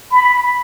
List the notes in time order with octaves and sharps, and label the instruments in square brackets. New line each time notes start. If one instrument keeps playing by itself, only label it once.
[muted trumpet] B5